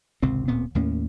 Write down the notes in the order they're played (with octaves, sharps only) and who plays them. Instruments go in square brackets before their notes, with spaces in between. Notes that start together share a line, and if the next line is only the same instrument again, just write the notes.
[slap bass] G#1 C#2 C3 C4
D1 A#2 B3 C4
D#2 A2 A#3 C#4